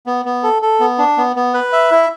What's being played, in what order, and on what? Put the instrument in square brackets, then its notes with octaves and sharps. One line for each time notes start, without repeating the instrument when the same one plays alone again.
[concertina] B3
B3
A4
A4
B3
D4
B3
B3
B4
E5
E4